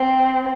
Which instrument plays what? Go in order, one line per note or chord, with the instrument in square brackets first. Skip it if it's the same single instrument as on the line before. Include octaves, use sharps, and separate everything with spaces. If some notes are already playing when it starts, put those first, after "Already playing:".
Already playing: [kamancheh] C4